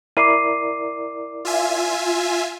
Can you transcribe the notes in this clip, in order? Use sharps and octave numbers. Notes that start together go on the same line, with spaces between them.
E4 A#4 D5 D6 C7 D#7
F4 E5 G#5